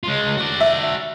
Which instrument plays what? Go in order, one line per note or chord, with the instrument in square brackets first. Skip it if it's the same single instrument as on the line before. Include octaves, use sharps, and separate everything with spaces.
[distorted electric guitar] G#3 F4
F#4 D5
[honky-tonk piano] E5